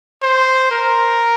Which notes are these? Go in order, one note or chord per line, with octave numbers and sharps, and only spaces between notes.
C5
A#4